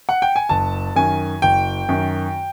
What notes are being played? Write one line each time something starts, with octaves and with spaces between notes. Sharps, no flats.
F#5
G5
G#5
F#1 A5
F#2 D#3 G#5
F#1 G5
F#2 D#3